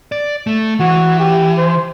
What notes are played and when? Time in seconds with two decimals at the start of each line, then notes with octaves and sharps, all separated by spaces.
0.12 D5
0.47 A3
0.80 E3 F#4
1.20 G4
1.58 C5